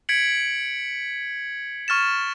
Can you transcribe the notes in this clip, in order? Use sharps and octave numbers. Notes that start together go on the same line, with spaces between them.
G#6 B6 C#7 D7 F#7
C#6 F6 A6 E7